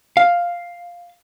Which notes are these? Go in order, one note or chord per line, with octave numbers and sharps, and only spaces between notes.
F5